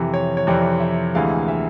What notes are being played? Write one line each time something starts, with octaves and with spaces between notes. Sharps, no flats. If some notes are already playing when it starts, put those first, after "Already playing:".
Already playing: F2 C3 E3
C#5
C#5
F2 C3 E3 D5
E5
D2 C3 E3 G#3 F5
E5